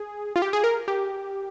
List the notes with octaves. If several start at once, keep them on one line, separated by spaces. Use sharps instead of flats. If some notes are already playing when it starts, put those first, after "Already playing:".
Already playing: G#4
F4
G4
G#4
A#4
G4